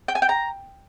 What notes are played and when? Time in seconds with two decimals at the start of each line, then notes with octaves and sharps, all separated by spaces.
0.08 G5
0.15 G#5
0.22 G5
0.29 A#5